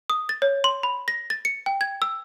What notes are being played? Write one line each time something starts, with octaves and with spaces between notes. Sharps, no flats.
D#6
A6
C#5
C6
B5
A#6
A6
C#7
G5
G#6
E6